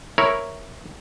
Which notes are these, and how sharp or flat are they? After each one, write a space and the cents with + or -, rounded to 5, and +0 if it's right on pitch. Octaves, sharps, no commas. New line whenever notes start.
E4 +0 A#4 +0 C#5 +0